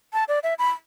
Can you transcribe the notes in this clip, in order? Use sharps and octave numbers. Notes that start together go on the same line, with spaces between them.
A5
D5
E5
B5